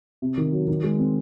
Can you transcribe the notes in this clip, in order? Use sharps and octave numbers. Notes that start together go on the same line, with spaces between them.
C3
D#3
F#3
D#3
G#3
C4